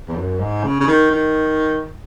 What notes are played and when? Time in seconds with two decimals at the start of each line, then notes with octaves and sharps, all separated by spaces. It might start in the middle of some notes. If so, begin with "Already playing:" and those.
0.08 E2
0.16 F#2
0.40 G#2
0.64 C#3
0.80 C#3
0.88 D#3
1.11 D#3